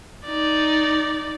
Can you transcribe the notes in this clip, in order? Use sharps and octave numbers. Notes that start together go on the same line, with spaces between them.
D#4 D5